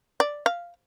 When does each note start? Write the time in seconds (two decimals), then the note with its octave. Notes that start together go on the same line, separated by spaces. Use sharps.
0.20 D5
0.46 F5